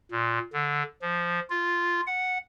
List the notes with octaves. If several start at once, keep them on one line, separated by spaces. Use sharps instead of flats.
A#2
D3
F3
F4
F#5